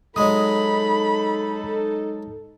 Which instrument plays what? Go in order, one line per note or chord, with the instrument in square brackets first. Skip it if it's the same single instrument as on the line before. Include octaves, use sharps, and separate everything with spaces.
[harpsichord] F#3 G#3 [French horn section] D#4 A4 [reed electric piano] D#5 D#6 [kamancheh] B5